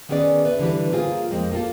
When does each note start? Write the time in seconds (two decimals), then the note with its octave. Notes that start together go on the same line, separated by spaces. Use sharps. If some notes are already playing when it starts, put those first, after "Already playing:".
0.09 D#3 B3 C#4 G#4 B4 D5
0.45 B4 E5
0.59 D3 E3 G3 B4
0.91 A#3 C4 F4 G#4
1.30 F2 G#3 A#3 C4
1.51 A#3 F4 A4